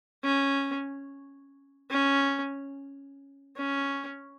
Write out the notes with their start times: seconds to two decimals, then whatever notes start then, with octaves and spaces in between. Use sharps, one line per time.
0.24 C#4
1.90 C#4
3.56 C#4